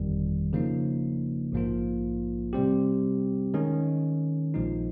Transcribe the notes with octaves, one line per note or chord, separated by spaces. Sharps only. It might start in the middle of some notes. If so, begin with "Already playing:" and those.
Already playing: G1 F2 D#3 G3
C#3 F3 A#3 D#4
A#1 G#2 F3 A#3 F4
C3 G3 C4 G4
D#3 G#3 C#4
A#1 A#2 F3 G#3 D#4